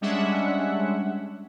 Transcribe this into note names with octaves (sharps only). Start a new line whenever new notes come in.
G3 G#3 C#4 D4 E5 F#5